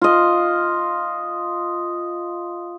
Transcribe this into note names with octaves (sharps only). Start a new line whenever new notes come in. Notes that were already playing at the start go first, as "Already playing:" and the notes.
F4 D#5